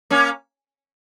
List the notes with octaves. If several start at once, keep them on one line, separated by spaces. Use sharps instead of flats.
A#3 C#4